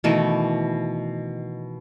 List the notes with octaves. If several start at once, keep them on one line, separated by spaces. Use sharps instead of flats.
B2 D#3 E3 A3